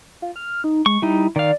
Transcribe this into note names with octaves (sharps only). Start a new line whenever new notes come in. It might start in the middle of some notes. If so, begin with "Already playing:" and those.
F4
F6
D#4
G#3 C#6
G3 D#4 E4
D#3 D5 F5